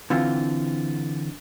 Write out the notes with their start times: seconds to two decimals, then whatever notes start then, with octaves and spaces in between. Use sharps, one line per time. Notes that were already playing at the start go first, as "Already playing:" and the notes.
0.10 D3 E3 C4 F4